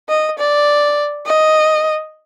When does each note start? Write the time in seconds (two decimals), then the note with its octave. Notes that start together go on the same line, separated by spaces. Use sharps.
0.09 D#5
0.39 D5
1.26 D#5